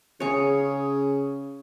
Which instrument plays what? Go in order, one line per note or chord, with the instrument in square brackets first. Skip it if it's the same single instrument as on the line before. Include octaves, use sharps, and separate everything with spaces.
[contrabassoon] C#3 [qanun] G#4 C#5